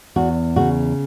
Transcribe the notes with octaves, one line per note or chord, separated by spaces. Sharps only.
E2 F#4
C#3 F#4